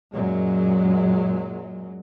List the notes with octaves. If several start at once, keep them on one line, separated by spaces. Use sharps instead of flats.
F#2 A#2 F#3 G#3